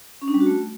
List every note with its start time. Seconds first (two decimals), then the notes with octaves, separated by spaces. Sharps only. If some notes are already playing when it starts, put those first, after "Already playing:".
0.22 C#4
0.28 D4
0.34 G3
0.40 F#4
0.46 A3